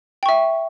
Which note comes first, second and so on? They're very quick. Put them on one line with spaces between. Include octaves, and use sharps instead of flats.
G5 C#6 E5